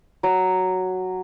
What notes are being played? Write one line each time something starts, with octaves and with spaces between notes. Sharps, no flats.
F#3